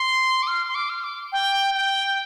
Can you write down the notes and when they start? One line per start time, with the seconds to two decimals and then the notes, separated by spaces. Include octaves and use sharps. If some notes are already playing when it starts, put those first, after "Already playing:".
Already playing: C6
0.43 D6
0.47 F6
0.68 C6
0.75 D6
0.89 F6
1.04 D6
1.32 G5
1.74 G5